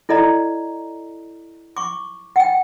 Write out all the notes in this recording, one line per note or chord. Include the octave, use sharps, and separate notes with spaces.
E4 A4 D5 D#5 A#5
C#6 D6
F#5 G5